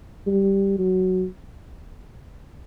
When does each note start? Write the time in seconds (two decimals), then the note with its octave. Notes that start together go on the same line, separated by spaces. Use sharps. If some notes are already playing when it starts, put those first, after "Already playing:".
0.27 G3
0.79 F#3